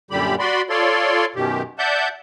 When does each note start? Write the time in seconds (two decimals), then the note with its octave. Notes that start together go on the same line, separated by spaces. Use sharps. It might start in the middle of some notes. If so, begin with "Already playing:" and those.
0.11 F#2 A#2 D3 G3 G4 B5
0.39 F#4 D5 B5 C6
0.70 F4 A4 C#5 D5 C6
1.35 F#2 B2 D#3 G4
1.78 D5 E5 F#5 A5 G6